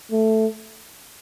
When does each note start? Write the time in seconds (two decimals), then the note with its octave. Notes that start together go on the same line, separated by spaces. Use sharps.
0.12 A3